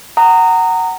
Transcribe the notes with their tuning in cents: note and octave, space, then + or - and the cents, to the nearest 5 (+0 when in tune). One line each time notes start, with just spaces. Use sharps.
F#5 +15 A#5 -20 D#6 -5